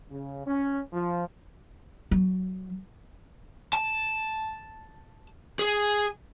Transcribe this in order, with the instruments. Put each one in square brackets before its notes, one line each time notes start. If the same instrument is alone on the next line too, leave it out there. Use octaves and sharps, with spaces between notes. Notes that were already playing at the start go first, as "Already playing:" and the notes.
[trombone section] C#3
C#4
F3
[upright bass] F#3
[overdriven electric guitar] A5
G#4